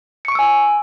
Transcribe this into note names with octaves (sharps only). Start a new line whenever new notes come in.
G#5 C#6 E6 C#7 D7